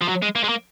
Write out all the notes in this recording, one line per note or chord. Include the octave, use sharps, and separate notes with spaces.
F3
F#3
G#3
A#3
G#3
A#3